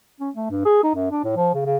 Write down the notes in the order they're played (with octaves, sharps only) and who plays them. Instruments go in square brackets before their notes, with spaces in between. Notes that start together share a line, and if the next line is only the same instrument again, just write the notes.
[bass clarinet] C#4
A3
G2
G#4
D#4
F#2
D4
A2
F3
C#3
C#3